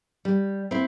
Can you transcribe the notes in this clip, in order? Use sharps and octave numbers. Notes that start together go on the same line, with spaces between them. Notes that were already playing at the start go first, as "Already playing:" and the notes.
G3
C4 E4